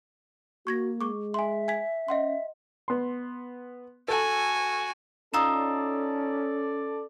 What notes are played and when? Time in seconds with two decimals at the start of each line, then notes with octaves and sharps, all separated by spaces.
0.67 A#3 F#4 C#6 G#6 A#6
1.01 G#3 C#6 D6
1.34 E5 G#5 C6
1.68 G#5 G#6 B6
2.08 C#4 D#5 F#5 C6
2.88 B3 C6
4.08 F#4 A4 G#5
5.34 C#4 D#4 F4 A4 D5 D#6 E6 E7